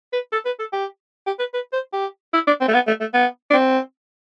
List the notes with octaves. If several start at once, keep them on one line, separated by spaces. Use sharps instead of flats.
B4
A4
B4
A4
G4
G4
B4
B4
C5
G4
E4
D4
C4
A3
B3
A3
A3
B3
D4
C4